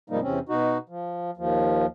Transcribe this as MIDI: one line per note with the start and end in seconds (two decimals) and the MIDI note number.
0.10 0.20 44
0.10 0.20 48
0.10 0.20 53
0.10 0.20 55
0.10 0.20 58
0.10 0.20 63
0.22 0.39 40
0.22 0.39 48
0.22 0.39 60
0.22 0.39 61
0.49 0.78 47
0.49 0.78 63
0.49 0.78 66
0.89 1.31 53
1.37 1.86 39
1.37 1.86 53